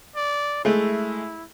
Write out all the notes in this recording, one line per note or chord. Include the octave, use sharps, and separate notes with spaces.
D5
G#3 A3 E4